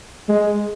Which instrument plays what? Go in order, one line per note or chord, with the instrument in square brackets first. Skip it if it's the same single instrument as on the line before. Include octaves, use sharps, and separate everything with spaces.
[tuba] G#3